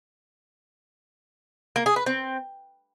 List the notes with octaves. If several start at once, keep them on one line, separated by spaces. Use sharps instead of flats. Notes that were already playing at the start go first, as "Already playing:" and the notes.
A#3
G#4
B4
C4